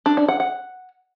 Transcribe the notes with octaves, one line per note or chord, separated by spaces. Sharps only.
D4
D4
F#5
F#5